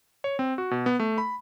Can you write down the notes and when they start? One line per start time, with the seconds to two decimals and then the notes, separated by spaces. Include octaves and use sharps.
0.24 C#5
0.39 C4
0.58 F#4
0.71 B2
0.86 B3
1.00 A3
1.18 B5